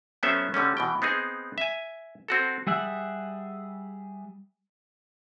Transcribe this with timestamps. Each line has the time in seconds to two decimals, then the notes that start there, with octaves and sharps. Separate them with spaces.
0.23 F#3 A3 B3 C#4 C5 E5
0.54 D3 G3 A3 C#4
0.77 B2 E3 G5
1.02 B3 C4 D#4 G#4
1.58 E5 G#5
2.28 C4 F#4 A4
2.67 G3 G#4 E5 F#5